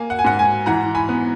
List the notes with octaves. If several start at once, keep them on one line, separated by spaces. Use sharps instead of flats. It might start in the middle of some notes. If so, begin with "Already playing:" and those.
Already playing: A#3 G#5
F#5
G#5
G#2 F#5
G#5
E3 F#5 A#5
G#5 B5
B3